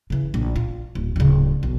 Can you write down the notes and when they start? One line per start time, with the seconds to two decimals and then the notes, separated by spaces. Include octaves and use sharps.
0.10 C#3 E3
0.34 A#1
0.56 F4
0.95 D1
1.16 D1 C#3
1.63 B1